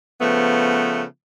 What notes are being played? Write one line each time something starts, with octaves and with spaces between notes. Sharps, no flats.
C#3 F3 A3 B3